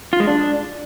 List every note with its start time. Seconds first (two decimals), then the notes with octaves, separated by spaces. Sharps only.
0.13 F4
0.20 G#3
0.27 D4